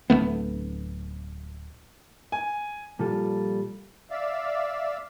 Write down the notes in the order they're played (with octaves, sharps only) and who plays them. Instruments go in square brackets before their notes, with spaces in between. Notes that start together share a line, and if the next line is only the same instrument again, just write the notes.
[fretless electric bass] D1 G#2 A3 B3
[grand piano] G#5
[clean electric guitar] A#2 F3 G3 F4 A4
[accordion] D5 E5 F5